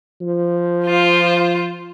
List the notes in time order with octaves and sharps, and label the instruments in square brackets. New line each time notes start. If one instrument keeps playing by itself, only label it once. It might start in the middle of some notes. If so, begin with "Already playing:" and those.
[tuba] F3
[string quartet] F4 C5